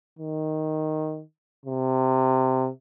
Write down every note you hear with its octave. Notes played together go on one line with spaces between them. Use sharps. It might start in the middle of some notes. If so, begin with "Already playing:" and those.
D#3
C3